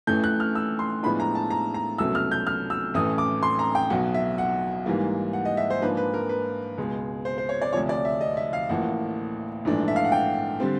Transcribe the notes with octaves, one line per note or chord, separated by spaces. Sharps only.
A1 A2 E3 A3 C#4 G6
F#6
F6
E6
C6
A2 F3 G#3 B3 D4 B5
A#5
A5
A#5
A#5
C2 B2 F#3 A3 C#4 E6
F6
G6
F6
E6
A1 A2 E3 A3 C#4 D#6
D6
C6
A#5
G5
B1 B2 F#3 F#5
E5
F#5
G#2 E3 G3 A#3
F#5
D#5
E5
C5
G#2 F3 A#3 D4 B4
B4
A#4
B4
C#2 B2 G#3
C5
C5
C#5
D5
D2 C3 F3 C#5
D5
E5
D#5
E5
F5
A1 A2 F3 A#3 F#5
A#1 G#2 E3 A3 D4
E5
F5
F#5
G5
D3 G3 C4